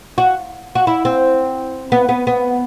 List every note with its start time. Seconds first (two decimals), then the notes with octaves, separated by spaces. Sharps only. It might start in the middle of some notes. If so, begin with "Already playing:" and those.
0.18 F#4
0.75 F#4
0.87 E4
1.05 C4
1.92 B3
2.09 B3
2.27 B3